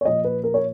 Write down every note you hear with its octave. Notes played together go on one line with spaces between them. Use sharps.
C#5
A#2 F3 D#5
B4
A#4
C#5